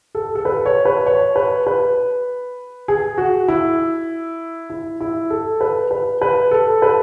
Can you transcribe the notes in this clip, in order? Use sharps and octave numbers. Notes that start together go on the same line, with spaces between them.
A4
A4
B4
C#5
B4
C#5
B4
B4
G#4
F#4
E4
E4
E4
A4
B4
B4
B4
A4
B4